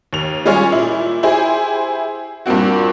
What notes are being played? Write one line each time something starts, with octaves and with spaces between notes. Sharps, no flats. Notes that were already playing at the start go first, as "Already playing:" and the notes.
D#2 F7
G3 G#3 C#4 F4 G#4 C#5
A#2 E4
E4 G4 G#4 C5
G2 A#2 A#3 C4 F#4